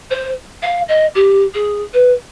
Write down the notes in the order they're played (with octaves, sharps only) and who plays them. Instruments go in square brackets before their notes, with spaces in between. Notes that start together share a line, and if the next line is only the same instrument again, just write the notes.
[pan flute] C5
F5
D#5
G4
G#4
B4